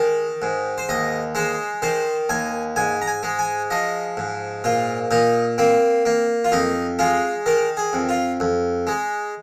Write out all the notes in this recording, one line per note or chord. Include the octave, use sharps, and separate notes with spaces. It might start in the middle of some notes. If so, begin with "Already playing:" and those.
Already playing: D#3 G#3 A#4
G#2
C5
D#2 D#5
G#3 C5
D#3 C5
D#2 G#5
G#2 G#5
A#5
G#5
G#3
G#5
F3 D#5
G#2
A#2 F4
A#2 D#4
A#3 C4
A#3
F4
F2 D#4
G#3 F4
D#3 A#4
G#4
F2
F4
F2
G#3